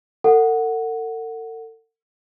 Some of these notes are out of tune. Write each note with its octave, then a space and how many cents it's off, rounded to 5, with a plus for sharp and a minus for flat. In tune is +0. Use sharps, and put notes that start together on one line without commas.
A4 +45 F#5 +0